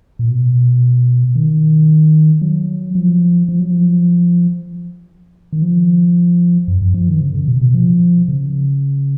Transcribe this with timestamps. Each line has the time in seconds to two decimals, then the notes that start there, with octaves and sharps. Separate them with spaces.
0.19 A#2
0.28 B2
1.36 D#3
2.42 F#3
2.95 F3
3.49 F3
3.60 F#3
3.71 F3
5.53 D#3
5.62 F3
6.68 F#2
6.82 F#2
6.94 F3
7.09 D#3
7.22 C#3
7.35 C#3
7.48 B2
7.61 B2
7.74 F3
8.28 C#3